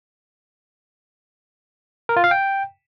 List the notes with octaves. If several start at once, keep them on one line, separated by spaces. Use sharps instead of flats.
A#4
F4
F5
G5